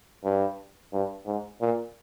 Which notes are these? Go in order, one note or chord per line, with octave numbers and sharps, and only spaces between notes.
G2
G2
G#2
A#2